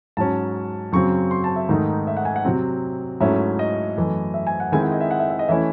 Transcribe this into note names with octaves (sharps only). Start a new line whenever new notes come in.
G#2 F#3 C#4 A5
F#2 C#3 F#3 C4 C#6
C6
A5
E5
G#2 D#3 A3 D#4
E5
F#5
G#5
F#5
C3 F#3 C4
G#2 F#3 A3 C#4 E4 E5
D#5
F#2 E3 A3
E5
G#5
F#5
D#3 G#3 C4 E4 G#5
F#5
D#5
E5
F#5
E5
E5
D#5
E3 A3 C#4 E4 E5